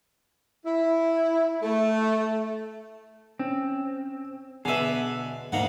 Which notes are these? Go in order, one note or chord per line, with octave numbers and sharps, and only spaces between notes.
E4
A3
C4 C#4
B2 D3 G#4 B4 E5 D#7
D2 G#2 A#3 F#5